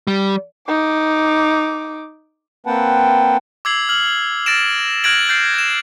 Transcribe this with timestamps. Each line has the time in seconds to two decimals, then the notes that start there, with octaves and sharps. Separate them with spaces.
0.07 G3
0.68 D#4 D6
2.66 A#3 C4 B4 F#5 G5 A5
3.65 D6 E6 G#6 C7 F#7
3.89 F6 F#7
4.46 F6 A6 A#6 D7 E7
5.04 F6 F#6 G#6 A#6 D7 F#7
5.28 F6 G6 A6 C7 D7
5.54 G#6 E7